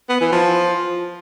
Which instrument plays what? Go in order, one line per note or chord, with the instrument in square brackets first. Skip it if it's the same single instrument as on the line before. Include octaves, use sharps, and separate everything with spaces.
[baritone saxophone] B3
E3
F3